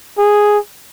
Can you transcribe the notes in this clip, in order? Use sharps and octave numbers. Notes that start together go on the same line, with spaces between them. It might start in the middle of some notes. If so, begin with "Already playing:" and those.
G#4